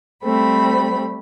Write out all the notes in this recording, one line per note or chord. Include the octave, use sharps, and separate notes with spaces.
G3 A3 C4 B5